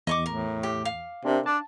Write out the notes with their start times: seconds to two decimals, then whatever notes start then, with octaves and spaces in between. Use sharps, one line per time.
0.07 E2 D#5 C#6 D6
0.26 A2 A#4
0.63 G4
0.85 F5
1.25 C3 C4 D4 A#4
1.46 D4 A5